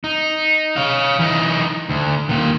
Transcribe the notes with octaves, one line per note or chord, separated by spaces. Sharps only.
D#4
C#5 F5
E3 D#4
D2
A#2 D#3